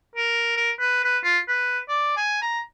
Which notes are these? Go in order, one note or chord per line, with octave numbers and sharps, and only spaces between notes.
A#4
A#4
B4
B4
F4
B4
D5
G#5
A#5